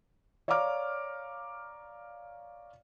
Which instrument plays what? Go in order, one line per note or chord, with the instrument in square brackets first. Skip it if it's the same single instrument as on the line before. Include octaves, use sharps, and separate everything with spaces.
[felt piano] C#5 D5 F5 A#5 D6 F6